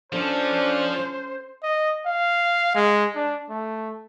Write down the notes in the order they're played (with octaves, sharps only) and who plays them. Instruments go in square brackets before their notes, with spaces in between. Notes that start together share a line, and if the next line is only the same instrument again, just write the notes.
[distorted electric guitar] F3 [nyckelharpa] C#4 A4 [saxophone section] D4 [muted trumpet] C5
[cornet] D#5
F5
G#3
D4
A3